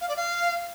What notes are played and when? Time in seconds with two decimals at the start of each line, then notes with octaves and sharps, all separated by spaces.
0.01 F5
0.09 D5
0.16 F5